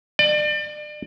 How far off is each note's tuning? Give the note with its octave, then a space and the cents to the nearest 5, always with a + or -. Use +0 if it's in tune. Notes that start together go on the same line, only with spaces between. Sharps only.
D5 +35